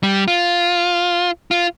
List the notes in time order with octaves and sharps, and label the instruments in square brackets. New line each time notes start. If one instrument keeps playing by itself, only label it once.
[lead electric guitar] G3
F4
F4